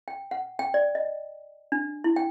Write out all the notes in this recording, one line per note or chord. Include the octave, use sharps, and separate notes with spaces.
G5
F#5
G5
D5
D#5
D4
E4
G5